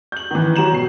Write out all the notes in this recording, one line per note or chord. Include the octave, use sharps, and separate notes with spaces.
G6 F#7
D#3 E3
F#3 A#5 E7 F#7
B2 C7